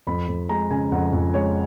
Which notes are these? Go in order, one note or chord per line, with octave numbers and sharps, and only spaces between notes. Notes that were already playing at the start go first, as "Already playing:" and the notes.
F2 B5
F2
G#3 A#5
C#3 G#5
F2 F#5
F2
G#3 C#5